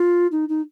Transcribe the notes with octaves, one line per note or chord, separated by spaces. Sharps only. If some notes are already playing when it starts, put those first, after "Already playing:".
Already playing: F4
D#4
D#4